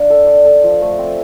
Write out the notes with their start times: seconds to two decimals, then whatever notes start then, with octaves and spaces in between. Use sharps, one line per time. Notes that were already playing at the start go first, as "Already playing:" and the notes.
Already playing: D4 F5
0.10 A4
0.27 D5
0.45 A4
0.63 F3
0.82 A3
0.98 C4